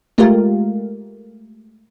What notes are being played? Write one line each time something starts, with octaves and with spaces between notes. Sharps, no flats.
G#3 A3 F4 G4 A#4 F5